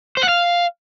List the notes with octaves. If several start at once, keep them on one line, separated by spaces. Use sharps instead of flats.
C5
F#5
F5